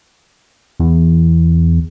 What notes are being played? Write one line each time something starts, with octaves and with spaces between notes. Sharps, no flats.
E2